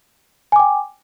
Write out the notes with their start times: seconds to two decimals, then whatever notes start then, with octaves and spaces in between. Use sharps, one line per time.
0.52 G#5
0.56 D6
0.60 G5